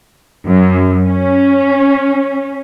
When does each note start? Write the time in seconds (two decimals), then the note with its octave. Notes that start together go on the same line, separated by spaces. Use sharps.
0.47 F#2
1.04 C#4